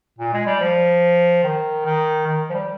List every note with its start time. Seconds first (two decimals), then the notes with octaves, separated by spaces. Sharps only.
0.19 A#2
0.33 G#3
0.46 G3
0.60 F3
1.44 D#3
1.85 D#3
2.27 D#3
2.50 F3
2.54 G3